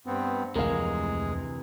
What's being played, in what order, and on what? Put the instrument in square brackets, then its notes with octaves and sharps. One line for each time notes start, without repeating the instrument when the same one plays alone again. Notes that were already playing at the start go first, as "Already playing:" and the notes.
[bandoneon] G2 B3 C4
[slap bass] F1 D2 [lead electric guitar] C3 E3 [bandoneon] G#3 G#4 [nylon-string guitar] A#4 F5